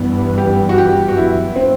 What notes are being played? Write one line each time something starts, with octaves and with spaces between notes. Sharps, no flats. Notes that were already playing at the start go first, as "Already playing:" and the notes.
Already playing: G2 E3 G3 B3
G4
F#4
G4
F#4
G2 F#3 B3 E4
C4